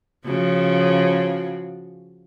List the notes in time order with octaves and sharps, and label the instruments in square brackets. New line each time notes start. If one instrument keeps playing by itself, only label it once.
[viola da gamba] C#3 F3 F#4